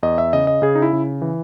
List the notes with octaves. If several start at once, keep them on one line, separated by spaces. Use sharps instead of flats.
E2 D#5
E5
C#3 D#5
D#5
C#3 G#4
D#4
E4
C#3
E3